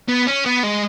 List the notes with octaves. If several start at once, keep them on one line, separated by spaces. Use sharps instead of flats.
B3
C#4
B3
G#3